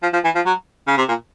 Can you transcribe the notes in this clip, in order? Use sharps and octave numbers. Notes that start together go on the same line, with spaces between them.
F3
F3
E3
F3
F#3
C#3
C3
A#2